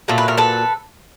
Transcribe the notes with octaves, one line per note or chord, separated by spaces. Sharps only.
A#2 F#3 A3
B4
A#4
A4 B4